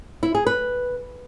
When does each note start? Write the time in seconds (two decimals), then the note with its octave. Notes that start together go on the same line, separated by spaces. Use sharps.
0.23 E4
0.35 G#4
0.46 B4